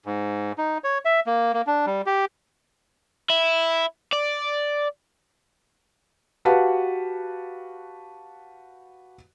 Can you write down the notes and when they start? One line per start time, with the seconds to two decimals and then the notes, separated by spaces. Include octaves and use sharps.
0.06 G#2
0.58 D#4
0.84 C#5
1.05 E5
1.27 A#3
1.53 A#3
1.67 D4
1.86 G3
2.06 G4
3.30 E4
4.13 D5
6.45 F#4 G4 B4 F5 F#5 A5